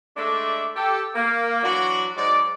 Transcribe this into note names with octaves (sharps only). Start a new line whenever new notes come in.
G#3 A3 D4 A4 D5 E5
G4 A4
A#3
E3 F#3 D4 F#4
G#2 F#3 G#3 D5